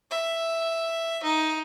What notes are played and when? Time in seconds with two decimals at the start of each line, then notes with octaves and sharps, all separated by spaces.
0.11 E5
1.23 D#4